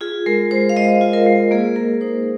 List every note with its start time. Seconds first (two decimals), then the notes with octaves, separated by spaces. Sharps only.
0.01 F4 G#4
0.26 G#3 A#4
0.51 G#3 C5
0.69 F5
0.76 G#3 D#5
1.01 F4
1.13 A#4
1.26 G#3
1.51 A#3 G#4
1.76 A#3 A#4
2.01 D#4 C5